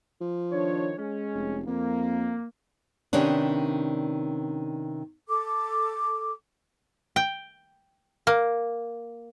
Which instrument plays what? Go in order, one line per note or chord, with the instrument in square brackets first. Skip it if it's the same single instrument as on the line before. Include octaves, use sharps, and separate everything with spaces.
[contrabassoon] F3
[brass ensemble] D#3 D4 C#5
G#3 C#4
[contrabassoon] F1
[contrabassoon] F2 [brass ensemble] A#3
[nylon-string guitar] C3 D#3 B3 C#4 D4
[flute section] A4 D6
[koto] G5
A#3